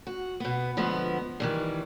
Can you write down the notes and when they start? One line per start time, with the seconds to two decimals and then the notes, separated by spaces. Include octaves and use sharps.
0.07 F#4
0.40 B2 B3
0.77 D3 F3 G#3 B3
1.40 D#3 E3 G3